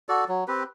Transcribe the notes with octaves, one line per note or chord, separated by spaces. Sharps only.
F#4 A4 D5
F#3
C4 G4 B4